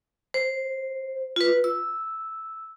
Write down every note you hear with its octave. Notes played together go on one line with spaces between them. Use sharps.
C5
F4 B4
E6